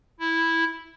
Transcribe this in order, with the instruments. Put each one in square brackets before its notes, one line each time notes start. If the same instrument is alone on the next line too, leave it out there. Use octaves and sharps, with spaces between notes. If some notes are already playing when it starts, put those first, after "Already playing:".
[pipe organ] E4